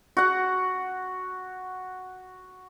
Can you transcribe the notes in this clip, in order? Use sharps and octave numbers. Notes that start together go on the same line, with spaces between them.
F#4 F#5